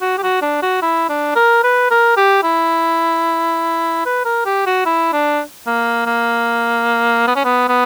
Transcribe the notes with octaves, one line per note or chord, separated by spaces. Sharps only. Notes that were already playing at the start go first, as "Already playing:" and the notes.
F#4
G4
F#4
D4
F#4
E4
D4
A#4
B4
A#4
G4
E4
B4
A#4
G4
F#4
E4
D4
A#3
A#3
B3
C#4
B3
B3